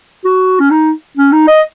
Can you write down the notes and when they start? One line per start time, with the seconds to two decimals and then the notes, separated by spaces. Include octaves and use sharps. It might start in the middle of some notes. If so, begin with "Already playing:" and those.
0.25 F#4
0.60 C#4
0.71 D#4
1.17 C#4
1.33 D#4
1.48 D#5